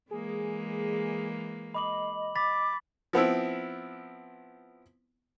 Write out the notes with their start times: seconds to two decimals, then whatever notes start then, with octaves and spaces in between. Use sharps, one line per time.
0.11 E3 G#3 A#3 G#4
1.74 D#5 B5 D6 F#7
2.36 B5 D6 A6 B6
3.13 F3 B3 C4 E4